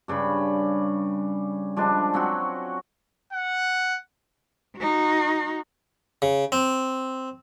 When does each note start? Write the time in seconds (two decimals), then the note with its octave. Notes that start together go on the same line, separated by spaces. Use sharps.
0.08 G2 C#3 G3 B5
1.77 F3 G3 G#3 D4
2.14 F#3 C4 C#4 F#4
3.33 F#5
4.77 D#4 F#4
6.22 C#3
6.52 C4